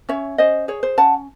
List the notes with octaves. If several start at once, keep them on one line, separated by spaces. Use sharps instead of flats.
C#4 C#5 E5
C#4 C5 D#5
G#4 C#5
C5
C#4 F#5 A5